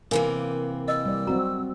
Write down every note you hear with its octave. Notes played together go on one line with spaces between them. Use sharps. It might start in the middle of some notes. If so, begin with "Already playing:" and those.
C3 E3 A#3 A#4 F5 G#5
D#5 E6
G3 D5
F#3 C4 F#4 A#5